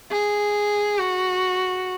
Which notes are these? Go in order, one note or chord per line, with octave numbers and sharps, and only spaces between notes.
G#4
F#4